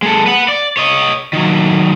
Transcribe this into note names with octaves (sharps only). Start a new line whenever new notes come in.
G#3 A4
B4 F#5
D5
C#5 D#5
D#3 F#3